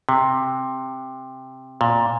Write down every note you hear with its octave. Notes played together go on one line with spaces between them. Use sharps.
C3
A#2